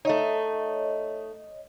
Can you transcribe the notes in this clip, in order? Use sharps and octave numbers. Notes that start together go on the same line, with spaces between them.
A3 D#4 C#5 D#5